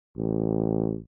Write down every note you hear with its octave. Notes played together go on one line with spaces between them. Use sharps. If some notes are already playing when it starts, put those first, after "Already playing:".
A1